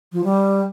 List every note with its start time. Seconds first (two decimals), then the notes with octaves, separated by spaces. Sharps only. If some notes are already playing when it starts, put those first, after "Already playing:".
0.13 F3
0.24 G3